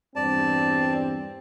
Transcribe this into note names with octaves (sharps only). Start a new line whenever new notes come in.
E2 G2 C4 D5 A5